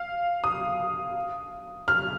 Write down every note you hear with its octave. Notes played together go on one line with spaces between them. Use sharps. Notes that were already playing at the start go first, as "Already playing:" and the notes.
Already playing: F5
D#6
F6